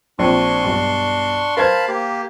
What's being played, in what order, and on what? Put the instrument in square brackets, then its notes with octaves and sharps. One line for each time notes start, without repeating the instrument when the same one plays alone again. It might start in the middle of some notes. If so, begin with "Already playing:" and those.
[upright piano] A#1 C4 [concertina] D4 C6 C#6
[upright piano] B1 G2
[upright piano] A#4 C5 G#6 [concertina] F5 A5 B5
[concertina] A#3 G4